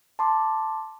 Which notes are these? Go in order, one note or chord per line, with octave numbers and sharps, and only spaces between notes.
A5 C6 D6